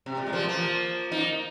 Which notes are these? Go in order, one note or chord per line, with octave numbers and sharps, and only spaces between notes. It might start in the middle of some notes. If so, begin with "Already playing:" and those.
C3
A#2
G#3
F3 A#3
F3 A#3
A#3 D#4